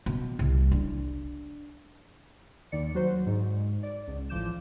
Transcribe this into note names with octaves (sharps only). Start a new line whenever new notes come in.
B2
C2
D4
D#2 D#3 D5 C#7
F#3 F#4 C5
G#2
D5
C#2
A1 F3 D6 G6 E7